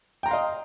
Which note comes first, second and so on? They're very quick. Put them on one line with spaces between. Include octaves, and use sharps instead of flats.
G5 A#5 C6 F5 D#5